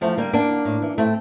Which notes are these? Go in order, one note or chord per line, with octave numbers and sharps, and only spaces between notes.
E2 F3 A3
D3 G3 A#3
E2 A#3 D4
D3
A2
E3
A2 A3 C4